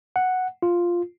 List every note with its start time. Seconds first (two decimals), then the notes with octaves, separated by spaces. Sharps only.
0.16 F#5
0.62 F4